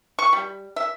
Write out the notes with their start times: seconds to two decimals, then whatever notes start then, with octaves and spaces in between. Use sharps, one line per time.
0.19 C#6
0.33 G3
0.76 E5